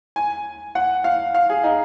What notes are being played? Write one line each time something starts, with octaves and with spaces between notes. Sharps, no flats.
G#5
F#5
F5
F5
G#4
D#4